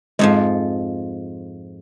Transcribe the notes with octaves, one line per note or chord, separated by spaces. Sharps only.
F2 G#2 F3 G#3